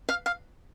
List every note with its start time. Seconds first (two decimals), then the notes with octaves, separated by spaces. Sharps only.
0.09 F5
0.26 F5